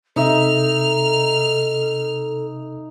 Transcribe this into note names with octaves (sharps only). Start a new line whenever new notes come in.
C3 D#4 A4 E5 F6